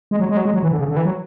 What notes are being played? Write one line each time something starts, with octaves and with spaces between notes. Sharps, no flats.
G#3
F#3
G#3
F#3
G#3
F#3
E3
D3
C#3
D3
E3
F#3